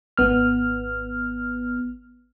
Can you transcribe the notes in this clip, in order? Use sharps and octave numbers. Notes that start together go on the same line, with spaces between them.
G#1 B3 F6